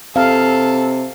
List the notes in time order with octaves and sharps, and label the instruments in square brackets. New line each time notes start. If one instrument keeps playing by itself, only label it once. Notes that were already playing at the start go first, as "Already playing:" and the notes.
[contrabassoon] C3 [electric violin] A4 [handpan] F5